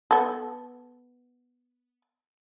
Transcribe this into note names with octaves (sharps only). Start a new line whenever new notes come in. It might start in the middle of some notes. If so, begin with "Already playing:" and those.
B3 A4